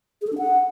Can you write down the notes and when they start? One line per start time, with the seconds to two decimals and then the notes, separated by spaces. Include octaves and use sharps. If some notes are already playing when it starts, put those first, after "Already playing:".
0.22 G#4
0.27 A4
0.32 D4
0.38 F#5